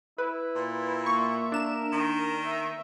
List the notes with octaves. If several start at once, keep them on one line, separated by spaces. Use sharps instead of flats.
E4 B4
A#2
A#3 E5 C#6
D4 A#4 E7
D#3
E5